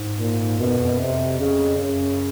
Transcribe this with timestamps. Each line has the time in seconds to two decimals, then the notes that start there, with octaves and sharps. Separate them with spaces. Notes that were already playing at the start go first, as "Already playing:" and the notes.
Already playing: G#2
0.19 A#2
0.59 F#2 B2
0.70 F#2
0.79 F2
0.89 F#2
0.99 F2 C3
1.39 C#3
1.78 F#2 C#3